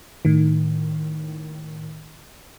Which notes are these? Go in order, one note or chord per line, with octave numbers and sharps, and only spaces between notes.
A2 D#3